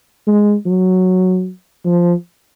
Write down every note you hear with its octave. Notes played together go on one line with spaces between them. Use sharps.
G#3
F#3
F3